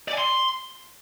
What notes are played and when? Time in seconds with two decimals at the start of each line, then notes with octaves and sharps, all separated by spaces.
0.08 D5
0.13 G#5
0.18 C6